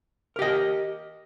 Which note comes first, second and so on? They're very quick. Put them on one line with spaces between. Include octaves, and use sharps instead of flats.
A#4 G4 D#5